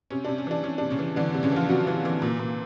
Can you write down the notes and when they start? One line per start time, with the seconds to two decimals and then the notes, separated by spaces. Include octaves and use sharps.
0.10 C3 C#4
0.25 C3 D4
0.38 C#4
0.47 E3 D4
0.63 E3 C#4
0.78 C3 D4
0.90 C#3 C#4
0.99 E3
1.16 D3 E3 D4
1.34 C3
1.43 C#3 C#4
1.52 E3 F3 F4
1.69 C3 F#3 F#4
1.87 E3
2.05 E3
2.22 A#2
2.39 A#2